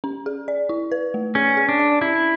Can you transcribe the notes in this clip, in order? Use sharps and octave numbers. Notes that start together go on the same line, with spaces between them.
C#4
G#4
D5
E4
B4
A3
C#4 G#4
G#4
D4
D5
C#4 E4